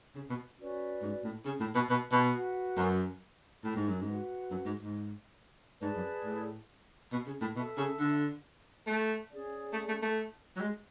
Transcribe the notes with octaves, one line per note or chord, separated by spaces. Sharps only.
C#3
B2
C#4 F#4 B4 D5
G#2
A2
C#3
A2
B2
B2
B2
F#4 B4 F#5
F#2
A2
G#2
F#2
G#2
F#4 B4 F#5
F#2
G#2
G#2
G#2 G#4 B4 D5 A5
F#2
A2
B2
C#3
A2
B2 A4 E5 A5
C#3
D3
A3
C#4 G#4 D5
A3
A3
A3
F#3
G#3